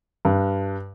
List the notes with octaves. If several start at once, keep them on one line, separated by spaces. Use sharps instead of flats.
G2